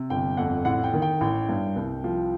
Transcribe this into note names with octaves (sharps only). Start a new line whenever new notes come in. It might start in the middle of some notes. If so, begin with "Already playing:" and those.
Already playing: C3
G1 G5
F2 F#5
A1 F#5
G5
D#3
G5
A1
G2
C2
F3